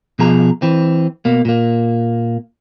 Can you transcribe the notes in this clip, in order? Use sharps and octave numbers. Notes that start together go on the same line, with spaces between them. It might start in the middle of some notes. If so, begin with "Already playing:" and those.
B2 F3 G#4 A#5
E3 C4
B2 A#3
A#2 A#3